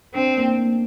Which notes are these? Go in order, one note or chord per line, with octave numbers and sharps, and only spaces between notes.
C4 D4
A#3
A#3